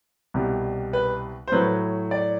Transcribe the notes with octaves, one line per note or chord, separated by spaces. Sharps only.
C2 B2 G3
B4
C5
A2 F#3 A3 B4
D5